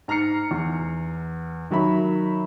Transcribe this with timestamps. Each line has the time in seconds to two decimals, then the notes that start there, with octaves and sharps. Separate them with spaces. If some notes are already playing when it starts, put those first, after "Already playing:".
0.08 G#2 A#5 F6 C7 C#7
0.51 E2
1.71 D#3 F#3 E5 B5